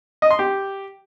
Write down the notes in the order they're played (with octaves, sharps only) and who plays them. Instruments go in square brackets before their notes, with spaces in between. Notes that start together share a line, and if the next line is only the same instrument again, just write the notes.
[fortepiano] D#5
C6
G4